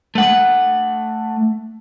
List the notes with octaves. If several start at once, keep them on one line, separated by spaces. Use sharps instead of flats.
A3 F#5